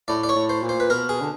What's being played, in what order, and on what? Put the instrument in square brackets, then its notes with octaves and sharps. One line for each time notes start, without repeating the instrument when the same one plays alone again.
[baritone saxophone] A2 [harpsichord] D5
[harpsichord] D5
C#5
[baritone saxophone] A2
[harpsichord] C5
[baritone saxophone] A#2
[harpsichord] C5
B4
[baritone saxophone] B2 [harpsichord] A#4
[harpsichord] G#4
[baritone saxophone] D3